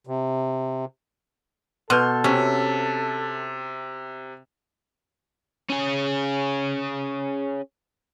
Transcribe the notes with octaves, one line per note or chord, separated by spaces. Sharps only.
C3
B2 A4 C6 F6 G6
C3 C#4
C#4 G#4